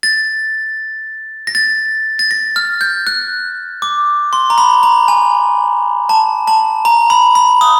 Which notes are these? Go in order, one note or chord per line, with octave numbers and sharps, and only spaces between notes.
A6
A#6
A6
A6
A#6
F6
G6
F#6
D6
C6
A#5
B5
A#5
G#5
A5
A5
A#5
B5
B5
D#6